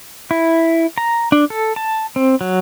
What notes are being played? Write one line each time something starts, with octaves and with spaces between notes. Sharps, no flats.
E4
A#5
D4
A4
A5
C4
F#3